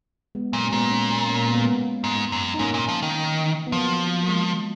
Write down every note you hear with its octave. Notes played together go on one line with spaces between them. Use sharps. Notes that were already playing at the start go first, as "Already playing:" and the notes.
G#3 B3
A#2 F#3 A#3
C#4
A#2 G#3 B3
A#3 C#4
A#3 C#4
A#3 C#4
B3
A#3
G#3 B3
G#2
F#2
D#4
G#2 A#3 C#4
A#2
F3
D#3
B3
F3 F#3 A#3
A#3
G#3